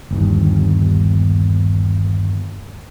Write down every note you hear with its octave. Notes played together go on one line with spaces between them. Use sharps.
G1 D#2